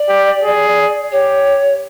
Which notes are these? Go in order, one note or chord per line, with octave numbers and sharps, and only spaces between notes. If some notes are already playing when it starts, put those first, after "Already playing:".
Already playing: D5
G4
G#4
G4 C#5